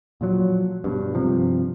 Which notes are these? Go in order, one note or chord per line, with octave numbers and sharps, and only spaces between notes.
A#2 F3 F#3
G2 B2
G2 C3 F3